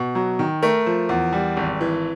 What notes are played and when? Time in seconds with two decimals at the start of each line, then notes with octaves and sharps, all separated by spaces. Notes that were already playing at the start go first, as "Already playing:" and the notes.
Already playing: B2
0.15 F#3
0.39 D#3
0.62 A3 A#4
0.87 F3
1.09 E2
1.33 G3
1.57 G#1
1.81 E3